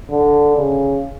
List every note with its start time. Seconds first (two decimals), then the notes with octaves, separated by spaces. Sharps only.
0.10 D3
0.56 C#3